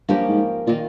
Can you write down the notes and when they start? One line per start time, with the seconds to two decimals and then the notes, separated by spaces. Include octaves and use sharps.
0.08 G2 F3 A#3 C#4 G4
0.29 G#2
0.67 A#2 D#3 A#3 F4